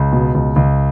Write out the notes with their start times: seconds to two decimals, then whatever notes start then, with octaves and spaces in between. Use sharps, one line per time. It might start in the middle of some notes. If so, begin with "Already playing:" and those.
Already playing: C#2
0.12 B2
0.35 C#2
0.56 C#2